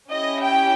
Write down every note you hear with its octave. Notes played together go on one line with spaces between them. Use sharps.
C#4 E4 G4 D#5
G5